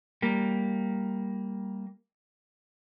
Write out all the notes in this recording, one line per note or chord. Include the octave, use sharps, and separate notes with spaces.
G3 A#3